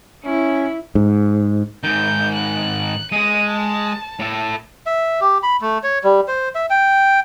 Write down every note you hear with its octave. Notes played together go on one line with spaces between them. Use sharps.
C#4 E4
G#2
G#2 D#3 G6
F#6
G#3 G#4 D#7
A5
A2 A4
E5
G4
B5
A3
C#5
G3
C5
E5
G5